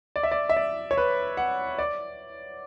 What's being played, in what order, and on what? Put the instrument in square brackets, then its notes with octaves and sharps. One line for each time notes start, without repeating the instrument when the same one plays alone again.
[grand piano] D5
E5
D5
E5
D5
C#5
B4
F#5
D5